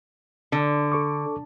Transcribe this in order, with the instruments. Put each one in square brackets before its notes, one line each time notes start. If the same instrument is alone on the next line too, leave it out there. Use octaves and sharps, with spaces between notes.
[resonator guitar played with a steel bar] D3
[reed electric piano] A4 C#6 D6